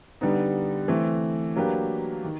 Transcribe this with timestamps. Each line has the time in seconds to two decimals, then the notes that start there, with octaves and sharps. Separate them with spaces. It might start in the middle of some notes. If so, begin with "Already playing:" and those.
0.21 D3 G3 B3 D#4
0.88 E3 A3 C4
1.56 F#3 A#3 D4 G4 B4
2.24 D#3